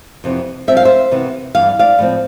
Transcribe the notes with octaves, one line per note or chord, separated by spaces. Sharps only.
F2 C3 E3 B3
G2 F3 C4 E5
F5
C5 E5
C3 E3 B3
G2 E3 B3 F5
D5 F5
A2 F3 C4